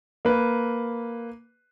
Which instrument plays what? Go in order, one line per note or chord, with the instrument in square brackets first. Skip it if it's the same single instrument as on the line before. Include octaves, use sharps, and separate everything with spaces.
[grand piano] A#3 B4